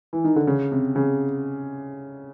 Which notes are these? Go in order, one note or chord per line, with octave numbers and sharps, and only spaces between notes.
E3
D#3
D3
C#3
C3
C#3